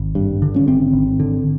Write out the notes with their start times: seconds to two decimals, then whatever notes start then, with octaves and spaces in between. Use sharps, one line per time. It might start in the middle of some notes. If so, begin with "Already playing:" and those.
Already playing: G#1
0.15 G2
0.42 D3
0.56 C#4
0.67 G#1 C4
0.93 G#1
1.20 D3